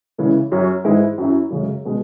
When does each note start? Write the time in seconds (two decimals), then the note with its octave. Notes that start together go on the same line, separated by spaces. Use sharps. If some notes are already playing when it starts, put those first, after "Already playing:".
0.18 C#3 E3 G#3
0.52 F#2 F#3 C#4
0.84 G#2 E3 G#3 E4
1.18 F#2 F#3 E4
1.50 F#2 C#3 G#3
1.85 B2 G#3 B3